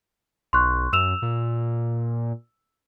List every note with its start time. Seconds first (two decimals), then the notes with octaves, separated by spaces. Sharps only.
0.53 B1 C6 C#6 F#6
0.93 F#2 E6 E7 F7
1.22 A#2